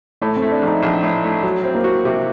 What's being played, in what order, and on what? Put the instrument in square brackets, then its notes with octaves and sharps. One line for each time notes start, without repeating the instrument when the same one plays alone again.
[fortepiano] A2 [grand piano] A3
[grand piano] C4
[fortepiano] A3
[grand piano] D4
[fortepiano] A#1 [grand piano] D#4
[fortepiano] A#1
A2
A3
F#3
C4
[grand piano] A#3
[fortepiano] F#4
C3